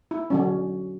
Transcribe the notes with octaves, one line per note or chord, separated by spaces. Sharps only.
E4
D3 F#3 C#4